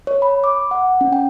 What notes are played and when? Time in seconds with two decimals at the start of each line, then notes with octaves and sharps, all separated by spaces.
0.07 C#5
0.22 B5
0.44 D6
0.71 F#5
1.01 C#4
1.13 G5